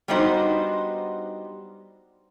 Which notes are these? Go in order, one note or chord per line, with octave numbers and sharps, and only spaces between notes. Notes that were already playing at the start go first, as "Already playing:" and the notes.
G3 B3 D4 D#4 F#4 C5